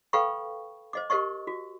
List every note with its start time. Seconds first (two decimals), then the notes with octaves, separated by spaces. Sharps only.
0.13 A4 B4 F5 G5 B5 C#6
0.93 C5 D#5 D6
1.10 G4 A#4 C5 D#5 C#6
1.47 F#4